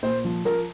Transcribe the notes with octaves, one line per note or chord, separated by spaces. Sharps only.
A#2 C5
F3
F3 A#4